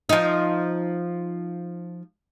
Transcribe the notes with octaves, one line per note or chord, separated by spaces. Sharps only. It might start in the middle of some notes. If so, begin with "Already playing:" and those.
F3 D#4